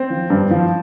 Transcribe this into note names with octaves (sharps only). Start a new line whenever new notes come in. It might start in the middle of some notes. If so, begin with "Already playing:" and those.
Already playing: C4
F3
G2
F3